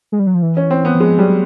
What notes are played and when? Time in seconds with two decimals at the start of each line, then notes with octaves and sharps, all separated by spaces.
0.12 G#3
0.19 G3
0.27 F#3
0.34 F3
0.42 E3
0.57 C#4
0.71 C4
0.85 B3
0.94 E3
0.99 F3 G#3
1.19 F#3 G3